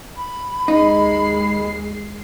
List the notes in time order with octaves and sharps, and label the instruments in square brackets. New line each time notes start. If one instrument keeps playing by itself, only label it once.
[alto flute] B5
[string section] D#2 G#3 C7 [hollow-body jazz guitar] D#4